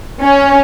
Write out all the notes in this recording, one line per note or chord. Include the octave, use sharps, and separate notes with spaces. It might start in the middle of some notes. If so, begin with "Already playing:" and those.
C#4